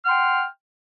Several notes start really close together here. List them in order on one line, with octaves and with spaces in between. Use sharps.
F6 F#5 C6 G5